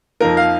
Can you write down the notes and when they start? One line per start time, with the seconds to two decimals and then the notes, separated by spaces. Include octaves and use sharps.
0.20 F2 F3 A#3 D#4 A#4
0.37 F5